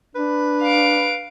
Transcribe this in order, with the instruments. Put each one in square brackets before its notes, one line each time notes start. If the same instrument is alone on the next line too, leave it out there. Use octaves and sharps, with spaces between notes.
[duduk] D4 [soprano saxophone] B4
[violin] F5 D7